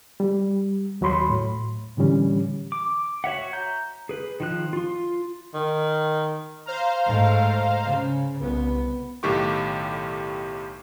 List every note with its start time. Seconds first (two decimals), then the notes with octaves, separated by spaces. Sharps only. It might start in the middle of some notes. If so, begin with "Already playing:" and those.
0.20 G3
1.01 D#2 F#3 C#5 B5 C6
1.30 A2
1.97 A2 D3 E3 G3 C#4
2.72 D6
3.24 F#4 C#5 E5 F#5
3.53 A#5 G6
4.09 G#4 B4
4.40 D#3 F3 F#6
4.73 F4 C6
5.54 D#3
6.66 C5 F5 A#5
7.06 G#2 A3
7.84 C#3
8.40 C2 B3
9.23 B1 A2 D#3 G4 C#6 D6